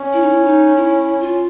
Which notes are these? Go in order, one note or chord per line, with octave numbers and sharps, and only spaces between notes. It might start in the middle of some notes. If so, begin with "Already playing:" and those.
Already playing: C#4
E4
D#4
E4
D#4
E4
F4